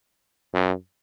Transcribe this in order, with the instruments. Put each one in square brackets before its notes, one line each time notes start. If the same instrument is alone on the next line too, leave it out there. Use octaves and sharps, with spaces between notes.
[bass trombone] F#2